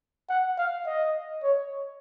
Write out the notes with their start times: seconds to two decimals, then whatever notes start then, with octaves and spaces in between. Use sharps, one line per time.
0.30 F#5
0.58 F5
0.86 D#5
1.43 C#5